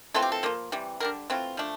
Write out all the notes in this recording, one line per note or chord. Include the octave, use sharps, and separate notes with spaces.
E3 A3 C4 F4 A4
G4
A4
F3 A#3 F4
C3 E3 G3
D3 G3 D4 A#4
E3 A3 C4 F4
F3 A3 D4